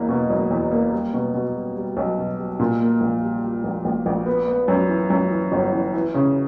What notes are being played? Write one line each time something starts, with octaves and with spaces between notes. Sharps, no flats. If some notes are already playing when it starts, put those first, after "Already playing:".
Already playing: F#1 E2 A#3
B2
F#1
E2
A#3
G3
B2
B2
G3
G3
B1
B2
G3
A#2
A#3
A#1
G3
G3
A#1
A#1
A#1
B3
B3
F#2
E3
F#2
E3
G1
E3
E3
C#3